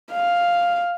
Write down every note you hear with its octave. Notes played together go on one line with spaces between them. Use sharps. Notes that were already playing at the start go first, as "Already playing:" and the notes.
F5